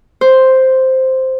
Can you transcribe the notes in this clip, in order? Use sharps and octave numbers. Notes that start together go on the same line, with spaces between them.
C5